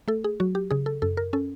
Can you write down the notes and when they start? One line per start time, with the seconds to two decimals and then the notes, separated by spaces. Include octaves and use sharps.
0.08 A3 A4
0.24 G#4
0.40 F#3 F#4
0.55 G4
0.71 C#3 G#4
0.86 A4
1.02 F#2 A4
1.17 A#4
1.33 C#4 A4